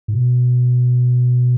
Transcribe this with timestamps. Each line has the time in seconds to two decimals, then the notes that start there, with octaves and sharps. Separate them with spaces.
0.08 A2
0.14 B2